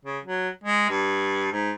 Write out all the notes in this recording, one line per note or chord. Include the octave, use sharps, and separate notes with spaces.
C#3
F#3
G#3
G2
G#2